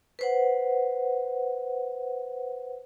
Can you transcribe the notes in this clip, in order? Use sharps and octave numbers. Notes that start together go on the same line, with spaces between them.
B4 C5 F#5